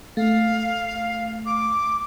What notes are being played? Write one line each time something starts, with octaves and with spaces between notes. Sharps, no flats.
A3 F5
D6